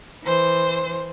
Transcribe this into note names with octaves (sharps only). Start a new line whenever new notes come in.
E3 C5